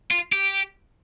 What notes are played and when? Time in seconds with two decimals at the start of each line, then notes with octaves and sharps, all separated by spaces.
0.11 F4
0.33 G4